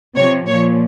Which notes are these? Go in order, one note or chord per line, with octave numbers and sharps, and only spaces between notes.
C3 F3 C#5
A#2 F3 C#5